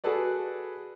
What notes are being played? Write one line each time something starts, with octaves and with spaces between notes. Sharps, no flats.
F#4 G#4 A4 B4 D5